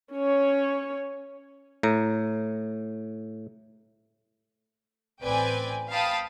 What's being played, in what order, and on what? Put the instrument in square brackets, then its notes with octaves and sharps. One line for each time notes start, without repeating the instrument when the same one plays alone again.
[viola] C#4 C#5
[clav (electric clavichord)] A2 A#5
[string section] A1 C4 B4 D5 G5 G#5
F5 G5 A5 B5 D#6